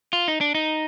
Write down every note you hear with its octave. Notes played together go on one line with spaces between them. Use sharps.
F4
D#4
D4
D#4